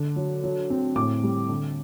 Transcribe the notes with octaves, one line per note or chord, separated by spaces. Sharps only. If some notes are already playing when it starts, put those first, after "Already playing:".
Already playing: D3
F#3
F#3
C4
A2 D6
G3
D3